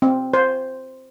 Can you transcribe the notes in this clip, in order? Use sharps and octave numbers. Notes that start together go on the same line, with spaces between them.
C4
C5